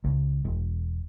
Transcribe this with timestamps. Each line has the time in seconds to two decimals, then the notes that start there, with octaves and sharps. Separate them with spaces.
0.04 C#2
0.45 E1